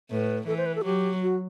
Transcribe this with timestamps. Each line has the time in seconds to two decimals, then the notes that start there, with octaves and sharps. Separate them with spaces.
0.11 A2 B4
0.47 E3 A4
0.57 C5
0.66 B4
0.76 A4
0.84 F#3 G4
1.22 F#4